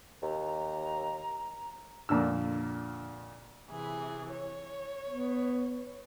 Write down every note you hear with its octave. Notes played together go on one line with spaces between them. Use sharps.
D#2 A#5
F2 A#2 D3 E6
C3 E3 G#4
C#5
B3